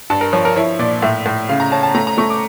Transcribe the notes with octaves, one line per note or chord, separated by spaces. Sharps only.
G2 A5
A#4
F3 C#5
A#4
E4 C#5
A#2 D5
A2 E5
A2
C#3 F5
A#5
C#4 A5
A5
A3 A#5
A#5
A3 C#6
D6